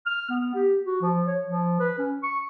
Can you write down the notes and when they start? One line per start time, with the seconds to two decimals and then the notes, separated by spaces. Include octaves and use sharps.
0.06 F6
0.29 B3
0.55 G4
0.85 F#4
1.02 F3
1.27 C#5
1.47 F3
1.80 B4
1.98 C#4
2.23 C#6